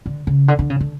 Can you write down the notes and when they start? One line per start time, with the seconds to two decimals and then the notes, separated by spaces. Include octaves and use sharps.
0.06 D3
0.27 C#3
0.48 D3
0.59 D3
0.70 C#3
0.80 D3